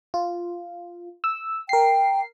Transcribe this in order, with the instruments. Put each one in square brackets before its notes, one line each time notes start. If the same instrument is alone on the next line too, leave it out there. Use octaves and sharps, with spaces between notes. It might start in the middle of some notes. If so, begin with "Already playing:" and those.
[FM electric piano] F4
E6
[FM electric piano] A#4 C7 [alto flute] G5